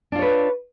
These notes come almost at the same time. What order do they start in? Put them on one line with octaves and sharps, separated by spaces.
D4 F4 C#5 B4